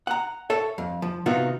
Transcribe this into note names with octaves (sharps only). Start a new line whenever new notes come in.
F#5 A#5
A4 C#5 E5
F2
F3
C3 D#3 B3 D#4 F4 F#4